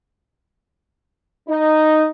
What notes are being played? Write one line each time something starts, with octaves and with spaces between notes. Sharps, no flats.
D#4